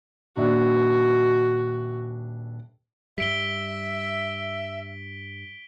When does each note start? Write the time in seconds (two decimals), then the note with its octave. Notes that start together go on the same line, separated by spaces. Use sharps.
0.37 D#1 D4 F#4 E5
3.18 G2 G3 E5 B6 D7 G7